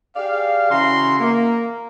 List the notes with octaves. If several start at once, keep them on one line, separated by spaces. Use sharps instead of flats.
G4 G#4 D5 F5
C#3 E3 E4 F#4 A#5 C6
A#3